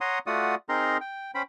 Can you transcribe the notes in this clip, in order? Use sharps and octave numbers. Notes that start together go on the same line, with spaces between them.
C#5 F#5 A#5 C6 D#6
A3 F4 F#4 D5 F#5 D#6
C4 D#4 G#4 A#4 A#5 C6
G5
C#4 C5 G5 B5